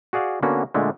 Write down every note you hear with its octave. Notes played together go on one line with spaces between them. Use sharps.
F#4 G#4 D5 F5 F#5
D3 A#3 B3 C#4 F#4
A#2 D3 G#3 A3